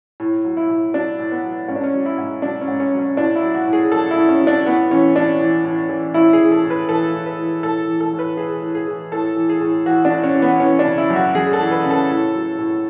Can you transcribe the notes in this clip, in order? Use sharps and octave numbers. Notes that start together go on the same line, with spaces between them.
A2
F#3
E4
A2
F#3 D4
A2
B3
F#3
G#2 C#4
D4
C#4
F#3
E4
G#2
F#3 D4
C#4
G#2
C#4
F#3
C#4
A2 D4
E4
F#3
F#4
A2
G#4
F#3 A4
E4
A2
C#4
F#3
D4
A2 B3
E3 C#4
A2 D4
E3
A2
E3
A2 E4
G#4
E3
A4
A2
B4
E3 A4
A2
B4
E3
A2 A4
E3
A4
A2
B4
E3 G#4
A2
G#4
E3
A2 A4
E3
G#4
A2
E3 F#4
D4
A2
C#4
E3
B3
E3 C#4
D4
C#3
E4
F#2
F#4
F#2 G#4
A4
E3
B4
C#3
A4
A2
F#3
A2